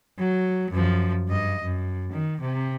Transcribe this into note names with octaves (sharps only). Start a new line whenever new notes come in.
F#3
F#2 F3
G2 D#5
F#2
D#3
C3